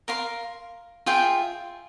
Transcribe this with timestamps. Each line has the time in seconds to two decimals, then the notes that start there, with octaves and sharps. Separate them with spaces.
0.08 A#4 F5 C6
1.06 F4 G#4 E5 G5